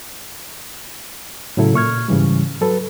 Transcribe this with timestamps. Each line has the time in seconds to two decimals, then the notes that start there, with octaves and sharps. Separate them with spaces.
1.57 A2 C#3 F#3 E4 A4
1.74 A#2 C#6 F6 G#6
2.08 G#2 C#3 E3 G3
2.61 F#3 A4 B4